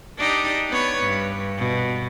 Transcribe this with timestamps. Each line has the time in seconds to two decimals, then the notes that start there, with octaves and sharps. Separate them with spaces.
0.18 D4 D#4 G4
0.70 B3 B4 C#5
1.03 G2
1.58 B2